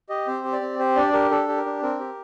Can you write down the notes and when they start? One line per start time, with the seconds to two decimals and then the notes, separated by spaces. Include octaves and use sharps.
0.09 G4 D#5
0.27 C4 C5
0.44 G4
0.53 D5
0.61 C4
0.79 G4 C5
0.96 D4 D5
1.13 G4 A#4
1.31 D4 A4
1.48 G4
1.57 A#4
1.65 D4
1.83 C4 A#4
2.00 G4